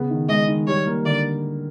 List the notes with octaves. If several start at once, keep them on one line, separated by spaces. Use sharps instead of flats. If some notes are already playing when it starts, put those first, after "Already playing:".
Already playing: C#3 B3
D#3
G#3 D#5
D#3
G3 C#5
A#3
D3 D5